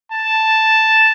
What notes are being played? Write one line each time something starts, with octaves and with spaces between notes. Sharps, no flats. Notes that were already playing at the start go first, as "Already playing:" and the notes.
A5